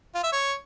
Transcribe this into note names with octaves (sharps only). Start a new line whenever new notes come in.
F4
E5
C#5